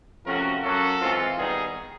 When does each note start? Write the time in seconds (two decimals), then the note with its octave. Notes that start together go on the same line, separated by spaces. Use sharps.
0.25 C3 F3 A3 C#4 F#4 A#4
0.63 F#3 A#3 C#4 F#4 A4
1.01 E3 G#3 C4 F4
1.38 D#3 G3 B3 D#4 G#4